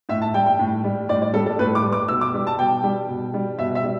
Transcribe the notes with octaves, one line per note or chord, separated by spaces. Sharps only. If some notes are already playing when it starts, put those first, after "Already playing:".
A2 E5
A5
G3 G5
G5
A2
G3
A2 D5
D5
G3 A4
A4
A2 B4
D6
G3
D6
B2 E6
D6
G3
A5
B2 G5
G3
B2
G3
B2 E5
E5
G3